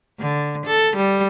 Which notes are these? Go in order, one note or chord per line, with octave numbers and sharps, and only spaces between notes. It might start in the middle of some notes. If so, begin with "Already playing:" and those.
D3
A4
G3